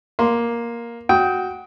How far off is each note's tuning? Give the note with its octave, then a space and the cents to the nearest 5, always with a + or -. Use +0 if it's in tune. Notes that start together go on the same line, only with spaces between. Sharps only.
A#3 +10 C6 -5
F#4 +0 G5 -5 D#6 +30